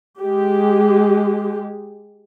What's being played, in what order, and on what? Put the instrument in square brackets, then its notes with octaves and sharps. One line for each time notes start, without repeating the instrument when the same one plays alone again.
[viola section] G#3 G4